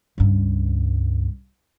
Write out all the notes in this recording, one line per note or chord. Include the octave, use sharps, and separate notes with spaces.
C#2 G2